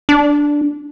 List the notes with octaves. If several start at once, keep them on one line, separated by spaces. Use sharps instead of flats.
D4